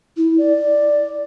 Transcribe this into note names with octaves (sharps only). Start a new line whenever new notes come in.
E4
D5